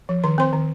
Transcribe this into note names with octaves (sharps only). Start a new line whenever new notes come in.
F3
D#3 C6
C4 C5 C6
D#3